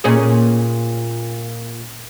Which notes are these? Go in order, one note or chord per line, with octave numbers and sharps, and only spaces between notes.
A#2 C#4 G#4